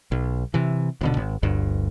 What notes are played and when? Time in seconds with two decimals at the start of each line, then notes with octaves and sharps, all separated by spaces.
0.12 B1
0.54 C3 E3
1.01 D#1 B2 D3
1.17 G#1
1.43 G1 D2 G2